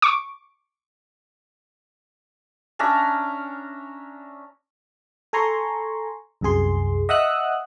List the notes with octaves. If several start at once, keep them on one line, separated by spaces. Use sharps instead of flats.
C#6 D6
C#4 D4 E5 A#5
A4 G#5 A#5 C6 C#6
C2 F#2 C3 G#4 C6
D#5 E5 F#5 D#6 E6 F#6